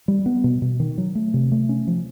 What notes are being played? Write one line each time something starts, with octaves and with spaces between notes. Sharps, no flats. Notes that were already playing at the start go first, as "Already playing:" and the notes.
G3
B3
B2
B2
D#3
F#3
A3
C3
A3
C#4
F3